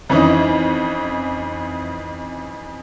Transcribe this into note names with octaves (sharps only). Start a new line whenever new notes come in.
F2 E3 C#4 D#4